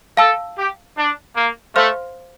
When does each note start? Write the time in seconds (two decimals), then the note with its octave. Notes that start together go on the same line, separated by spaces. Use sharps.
0.17 A4 F5 A5 E6
0.57 G4
0.96 D4
1.36 A#3
1.76 A3 C5 F5 C6 F6